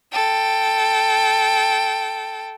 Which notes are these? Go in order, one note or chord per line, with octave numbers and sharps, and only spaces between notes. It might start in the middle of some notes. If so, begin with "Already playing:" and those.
A4 G5